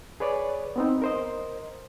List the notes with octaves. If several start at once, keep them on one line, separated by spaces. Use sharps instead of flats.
G#4 B4 C#5 D5
B3 C4 D#4
A#4 C5 D#5